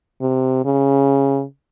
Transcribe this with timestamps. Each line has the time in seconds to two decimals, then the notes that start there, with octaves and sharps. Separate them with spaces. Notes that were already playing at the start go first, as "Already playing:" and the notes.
0.21 C3
0.65 C#3